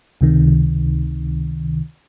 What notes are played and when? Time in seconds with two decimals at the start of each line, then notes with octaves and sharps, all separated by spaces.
0.21 C#2 C3 D#3